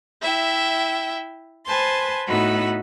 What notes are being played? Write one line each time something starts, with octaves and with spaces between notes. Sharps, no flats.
E4 E5 G5
B4 C5 G#5 A5 C6
A2 B3 D#4 F#4 B5 E6